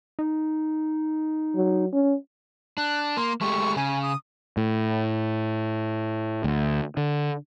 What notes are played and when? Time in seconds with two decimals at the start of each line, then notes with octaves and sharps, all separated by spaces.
0.19 D#4
1.55 F#3
1.93 C#4
2.78 D4 F#6
3.17 A#3 C6
3.41 G#3 A3 G4 C#6
3.76 C#3 G#5
4.02 D#6
4.57 A2
6.44 D2
6.97 D3